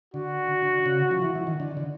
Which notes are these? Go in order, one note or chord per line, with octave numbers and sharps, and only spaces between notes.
D3 F#4
D3
C#3
F3
E3
E3
D#3
D3
D3